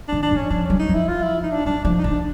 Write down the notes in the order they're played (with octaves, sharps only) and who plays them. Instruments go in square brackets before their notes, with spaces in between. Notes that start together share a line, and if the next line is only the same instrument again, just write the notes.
[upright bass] D#3 [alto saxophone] D4
[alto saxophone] D4
[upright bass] E3
[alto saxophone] C#4
[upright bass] F3 [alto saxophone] D4
[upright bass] F#3 [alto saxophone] C#4
[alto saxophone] D#4
[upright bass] F3
[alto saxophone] E4
F4
E4
D#4
D4
[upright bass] F#3 [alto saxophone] D4
[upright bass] F3 [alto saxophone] D4
[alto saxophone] D#4
[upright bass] F3 [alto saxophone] D4